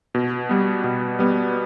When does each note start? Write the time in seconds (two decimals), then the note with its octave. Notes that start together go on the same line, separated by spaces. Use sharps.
0.15 B2
0.49 G3 B3
0.84 B2
1.19 G3 B3